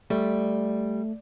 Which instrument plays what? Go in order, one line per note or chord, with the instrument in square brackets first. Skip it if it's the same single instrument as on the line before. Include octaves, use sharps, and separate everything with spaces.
[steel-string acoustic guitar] G3 [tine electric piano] A3